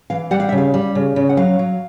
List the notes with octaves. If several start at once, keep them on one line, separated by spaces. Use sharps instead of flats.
E3 F5
G3 F#5
F5
E5
C#3
F5
G3
C#3
C#3
F#5
F#3 F5
F#3